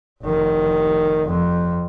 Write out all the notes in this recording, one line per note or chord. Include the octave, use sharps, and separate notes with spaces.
F1 D#3
F2